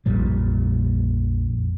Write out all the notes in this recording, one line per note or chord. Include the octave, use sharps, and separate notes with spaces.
A#1 F2 A#2 G3